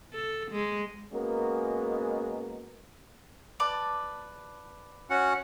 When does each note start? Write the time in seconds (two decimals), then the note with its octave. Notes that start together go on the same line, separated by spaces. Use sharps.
0.13 A4
0.52 G#3
1.13 G#3 A#3 B3 C#4 F#4 A#4
3.60 B4 D5 A5
5.10 C#4 F#4 F#5